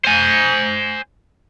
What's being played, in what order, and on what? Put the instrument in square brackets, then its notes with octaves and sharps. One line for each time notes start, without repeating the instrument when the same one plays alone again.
[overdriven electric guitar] C5 G#5